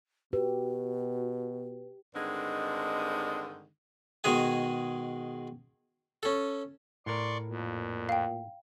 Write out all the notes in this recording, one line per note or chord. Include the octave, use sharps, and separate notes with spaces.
B2 F#4 G4 B4
G2 D3 D#3 G#3 C4 D#4
B2 D#3 G#3 G#4 G#5
C#4 A4
A2 A#4 D5 C6 C#6
F2 A#2
F5 G5